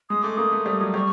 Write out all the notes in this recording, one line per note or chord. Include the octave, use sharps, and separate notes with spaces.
G#3 D#6
A3 D6
A#3 D#6
A3
G3
F#3
G3 C#6